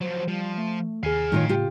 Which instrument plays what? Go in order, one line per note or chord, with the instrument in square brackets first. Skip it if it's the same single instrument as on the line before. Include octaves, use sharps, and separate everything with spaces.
[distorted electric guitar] F3 F#3 [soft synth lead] C5
[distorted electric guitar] F3 [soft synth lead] G3
[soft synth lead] A3
[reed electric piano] D#2 G#4 [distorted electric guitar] F5 G#5 [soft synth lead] F6
[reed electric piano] A2 [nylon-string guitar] D#3 F4 C#5
[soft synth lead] C#3 [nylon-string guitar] F4 G4